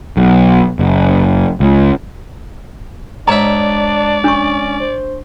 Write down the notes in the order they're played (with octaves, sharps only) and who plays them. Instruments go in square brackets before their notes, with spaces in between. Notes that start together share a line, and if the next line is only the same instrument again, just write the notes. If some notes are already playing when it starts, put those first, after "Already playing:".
[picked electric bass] B1
F#1
C#2
[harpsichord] G#2 C#5 E5 [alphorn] D4 [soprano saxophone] D5 [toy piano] A#5
[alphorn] C#4 [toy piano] D4 C#6
[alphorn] C5